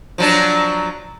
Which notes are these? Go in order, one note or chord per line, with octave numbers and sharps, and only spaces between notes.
F3 F#3 D4